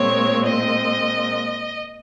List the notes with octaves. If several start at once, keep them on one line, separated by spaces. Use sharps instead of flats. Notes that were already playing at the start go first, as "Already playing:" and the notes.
Already playing: A#2 G#3 C4 C#5
D#5